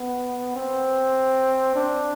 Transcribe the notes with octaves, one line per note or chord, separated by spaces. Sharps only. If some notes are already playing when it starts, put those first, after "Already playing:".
Already playing: B3
C4
D4